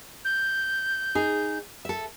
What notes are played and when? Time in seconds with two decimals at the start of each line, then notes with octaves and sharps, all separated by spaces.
0.25 G6
1.15 D#4 G#4
1.85 A4 E5